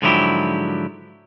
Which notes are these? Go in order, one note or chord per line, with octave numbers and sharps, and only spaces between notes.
G#2 D3 F3 F#3 E4 G4